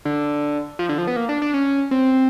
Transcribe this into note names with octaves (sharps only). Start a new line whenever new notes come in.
D3
F3
D3
F3
B3
A#3
D4
D4
C#4
C4